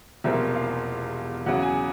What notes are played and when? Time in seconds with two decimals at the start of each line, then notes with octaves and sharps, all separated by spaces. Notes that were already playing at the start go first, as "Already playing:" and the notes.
0.24 E1 E2 C3 F3 A#3 E5
0.55 F5
1.46 E2 C#3 F#3 F#5
1.62 G#5